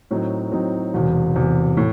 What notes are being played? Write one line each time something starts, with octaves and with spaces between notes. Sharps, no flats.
A2 F#3 C4 D#4
A2 F#3 C4 D#4
E1 E2 C3
E1 E2 C3
A2